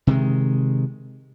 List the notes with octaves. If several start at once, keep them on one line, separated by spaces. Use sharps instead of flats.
C3 D#3 G#3